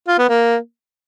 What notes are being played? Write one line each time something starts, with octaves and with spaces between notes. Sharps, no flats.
F4
B3
A#3